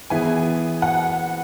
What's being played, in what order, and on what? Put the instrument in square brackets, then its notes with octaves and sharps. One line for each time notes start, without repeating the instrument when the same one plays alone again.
[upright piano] E3 B3 E4 G#4 [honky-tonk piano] G#5
[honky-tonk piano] F#5